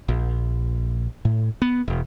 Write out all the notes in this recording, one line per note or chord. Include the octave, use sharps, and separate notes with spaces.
A#1
A2
B3
E1